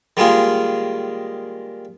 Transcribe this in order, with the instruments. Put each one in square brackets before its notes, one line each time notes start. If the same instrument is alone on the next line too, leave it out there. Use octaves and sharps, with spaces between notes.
[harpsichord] D#3 G3 G#3 A#3 F4 G#4